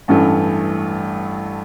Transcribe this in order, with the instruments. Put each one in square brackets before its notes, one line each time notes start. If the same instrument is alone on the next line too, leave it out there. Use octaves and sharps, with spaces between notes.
[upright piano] A1 G2 E3 A3